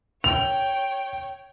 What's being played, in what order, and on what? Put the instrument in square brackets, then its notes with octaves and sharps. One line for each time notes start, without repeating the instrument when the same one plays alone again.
[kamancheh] C#5 G5 [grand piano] F7